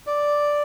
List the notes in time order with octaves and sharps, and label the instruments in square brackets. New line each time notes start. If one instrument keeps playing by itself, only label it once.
[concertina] D5